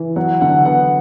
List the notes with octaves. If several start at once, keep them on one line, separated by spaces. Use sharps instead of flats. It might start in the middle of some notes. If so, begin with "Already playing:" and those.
Already playing: E3
F#3 F#5
D3 F#5
B3 F#5